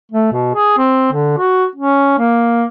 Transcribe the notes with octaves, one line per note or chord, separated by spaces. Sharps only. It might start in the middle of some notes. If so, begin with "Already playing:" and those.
A3
B2
G#4
C4
D3
F#4
C#4
A#3